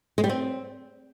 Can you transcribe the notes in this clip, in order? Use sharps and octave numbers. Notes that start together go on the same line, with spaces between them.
G#3
G3
C4